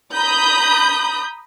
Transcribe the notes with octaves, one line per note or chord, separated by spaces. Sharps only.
A#5 B5 D#6 G6